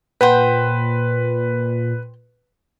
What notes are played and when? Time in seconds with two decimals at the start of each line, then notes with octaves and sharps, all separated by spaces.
0.21 A#2 B4 C5 F#5 G5